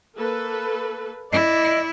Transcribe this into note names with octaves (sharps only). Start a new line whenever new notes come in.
A#3 A4 B4
E4 D5 D#5